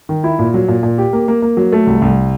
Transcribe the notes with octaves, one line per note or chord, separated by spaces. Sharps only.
D#3
E4
A#2
F#3
A#2
A#2
G4
A#3
A#3
A#3
F#3
A3
C2
C2